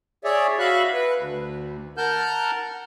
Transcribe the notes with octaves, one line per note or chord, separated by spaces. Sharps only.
G#4 C#5 D5 E5
F#4 E5 F5 B5 C#6 F#6
B4
D2
A#4 F#5 A5 F6 G6